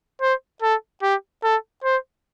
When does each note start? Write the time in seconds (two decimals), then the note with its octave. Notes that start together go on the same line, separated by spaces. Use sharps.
0.21 C5
0.62 A4
1.02 G4
1.43 A4
1.84 C5